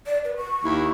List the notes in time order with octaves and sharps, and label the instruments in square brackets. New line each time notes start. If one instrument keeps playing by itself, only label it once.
[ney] D5
B4
C#6
[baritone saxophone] D#2 [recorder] E4